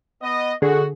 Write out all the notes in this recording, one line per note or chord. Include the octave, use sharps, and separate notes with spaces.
B3 D#5
D3 F#4 G#4